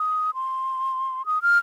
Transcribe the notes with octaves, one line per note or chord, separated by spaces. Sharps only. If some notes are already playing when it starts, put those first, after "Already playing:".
Already playing: D#6
C6
D#6
F6